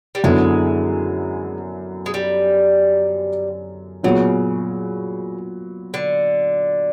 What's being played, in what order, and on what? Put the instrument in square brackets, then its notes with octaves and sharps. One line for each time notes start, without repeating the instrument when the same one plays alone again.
[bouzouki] G3
[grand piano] F#2 D3 F#3 B3 E4 [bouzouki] G#3
[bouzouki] G#3
G3
[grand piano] A#2 F#3 B3 [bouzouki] C#3
[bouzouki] D3